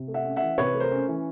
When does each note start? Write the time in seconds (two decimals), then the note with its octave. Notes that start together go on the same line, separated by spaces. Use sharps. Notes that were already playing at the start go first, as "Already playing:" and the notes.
Already playing: C3
0.08 A3
0.14 E5 F#5
0.25 C#4
0.36 E5 F#5
0.42 E3
0.58 C3 B4 C#5
0.74 A3
0.80 A#4 C5
0.92 C#4
1.08 E3